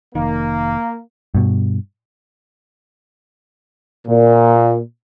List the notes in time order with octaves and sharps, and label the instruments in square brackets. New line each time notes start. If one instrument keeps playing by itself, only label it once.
[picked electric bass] F1 D#3 [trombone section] A#3
[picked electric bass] G2 B2
[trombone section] A#2